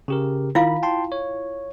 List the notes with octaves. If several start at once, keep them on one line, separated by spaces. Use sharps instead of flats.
C#3 G4 A#4
D#3 E4 F4 F5 B5
G5 A5 C6
C#5